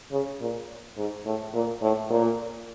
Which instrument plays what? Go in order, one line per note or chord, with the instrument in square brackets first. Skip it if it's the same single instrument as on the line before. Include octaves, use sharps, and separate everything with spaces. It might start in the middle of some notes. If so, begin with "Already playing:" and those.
[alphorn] C#3
A#2
G#2
A2
A#2
A2
A#2